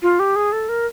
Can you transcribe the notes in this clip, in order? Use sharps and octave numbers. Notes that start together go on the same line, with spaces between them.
F4
G4
G#4
A4
A#4